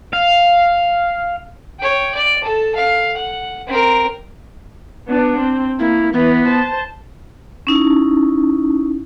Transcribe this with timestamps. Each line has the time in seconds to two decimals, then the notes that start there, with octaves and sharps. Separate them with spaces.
0.13 F5
1.79 C#5 G5
2.14 D5
2.43 A4 A5
2.75 F5
3.16 F#5
3.67 C4 A#4
5.08 B3 D4
5.38 C4
5.79 A#3 E4
6.13 E3 B3
6.44 C5 A5
7.67 C#4 D#4 E4